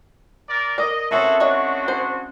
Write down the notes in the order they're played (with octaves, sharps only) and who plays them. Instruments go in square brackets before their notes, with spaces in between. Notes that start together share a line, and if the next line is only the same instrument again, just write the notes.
[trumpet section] A#4 D5
[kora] A#4 [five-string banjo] D5 [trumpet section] D#5
[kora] C4 C#4 E4 [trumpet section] F#4 G#4 A4
[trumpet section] G#3 D4 F#4 [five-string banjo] C#5 D#5
[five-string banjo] C5